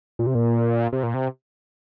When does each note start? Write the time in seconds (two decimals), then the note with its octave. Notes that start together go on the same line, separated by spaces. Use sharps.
0.19 A#2
0.27 C3
0.35 A#2
0.93 C3
1.03 A#2
1.14 C3